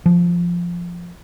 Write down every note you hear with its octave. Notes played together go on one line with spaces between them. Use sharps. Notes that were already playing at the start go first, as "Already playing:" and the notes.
F3